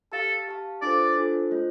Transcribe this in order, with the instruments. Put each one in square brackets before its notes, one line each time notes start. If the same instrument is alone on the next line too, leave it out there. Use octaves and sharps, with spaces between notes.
[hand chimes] G4 F5 A5 [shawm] A4
[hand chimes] G4 F5 A5
[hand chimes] D4 F4 A4 C5 [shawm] D5
[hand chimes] D4 F4 A4 C5
A3 F4 C5